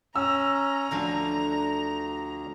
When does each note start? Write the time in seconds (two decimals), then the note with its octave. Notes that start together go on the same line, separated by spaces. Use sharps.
0.16 C#4 A#5 E6
0.91 D2 D3 F3 D4